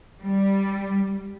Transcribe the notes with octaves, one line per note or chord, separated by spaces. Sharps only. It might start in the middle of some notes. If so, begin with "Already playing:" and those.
G3